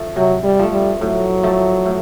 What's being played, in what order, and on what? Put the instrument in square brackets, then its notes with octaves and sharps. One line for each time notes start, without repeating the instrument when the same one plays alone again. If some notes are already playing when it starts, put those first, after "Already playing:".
Already playing: [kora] F3 A3
[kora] C3 [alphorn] F#3
[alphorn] G3
[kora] F3 A3
[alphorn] G3
[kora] A2 [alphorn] F#3
[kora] F3 A3
A2